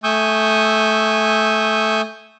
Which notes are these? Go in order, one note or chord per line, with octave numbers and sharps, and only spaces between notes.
A3 G#5 C#6 D#6 E6 G6